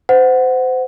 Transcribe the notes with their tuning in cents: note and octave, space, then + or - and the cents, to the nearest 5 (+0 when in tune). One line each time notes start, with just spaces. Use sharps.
C5 -25 F#5 +0